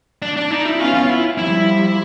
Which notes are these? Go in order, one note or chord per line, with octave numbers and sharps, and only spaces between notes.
D4
D4
D#4
E4
B3 C#4 F4
F4
E4
F3 G3 E4